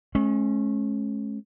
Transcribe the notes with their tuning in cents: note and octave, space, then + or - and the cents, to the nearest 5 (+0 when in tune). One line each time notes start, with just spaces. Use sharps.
G#3 +45 C#4 -25